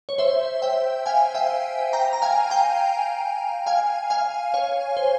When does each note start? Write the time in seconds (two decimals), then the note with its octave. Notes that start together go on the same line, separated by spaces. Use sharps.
0.09 C#5
0.18 C5 E5
0.62 E5 G5
1.06 F5 G#5
1.35 E5 G5
1.93 G5 A#5
2.13 A#5
2.22 F5 G#5
2.50 G5 A#5
3.66 F5 G#5
4.10 F5 G#5
4.54 C#5 F5
4.97 C5